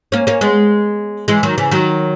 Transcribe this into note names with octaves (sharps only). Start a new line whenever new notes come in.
A#3 C#4
A#3 C#4
G#3 B3
E3 G#3
D#3 F#3
C#3 E3
D#3 F#3